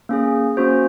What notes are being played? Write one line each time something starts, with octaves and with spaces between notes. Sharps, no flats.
A#3 C#4 G#4
A#3 C#4 F#4 C5